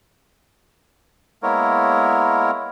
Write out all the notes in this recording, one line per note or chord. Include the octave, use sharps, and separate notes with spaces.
G#3 A#3 B3 E4 A#4 C#5